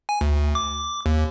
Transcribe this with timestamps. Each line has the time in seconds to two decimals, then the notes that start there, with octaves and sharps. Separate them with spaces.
0.09 G#5
0.21 D2
0.55 D6
1.06 D#2